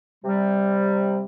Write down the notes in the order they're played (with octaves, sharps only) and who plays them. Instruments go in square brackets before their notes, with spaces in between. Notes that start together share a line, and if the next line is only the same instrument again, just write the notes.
[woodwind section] C3 G3